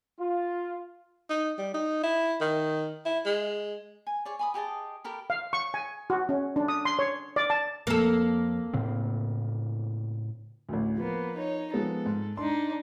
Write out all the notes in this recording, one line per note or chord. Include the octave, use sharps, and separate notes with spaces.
F4
D#4
G3
D#4
E4
D#3
E4
G#3
G#5
G#4 C#5 D5
G#5 B5 D#6
G4 G#4 D#5 A5
G4 A4 A#4 B5
F5
C#6
G#5
F#4
C#4
D4
D#6
C6
C#5
D5
A5
F2 A#3 A4
A2 C#3 C4
A1 D2
F3 A#3 B3
D#4 C#5
F3 G#3 B3 A4
G#2
D4 D#4 C6